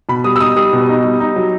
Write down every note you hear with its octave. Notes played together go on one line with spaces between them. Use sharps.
B2 B5
G3 D#6
E6
D#4 D#6
G3 D#6
B2
D#4
G3
D#4
F#3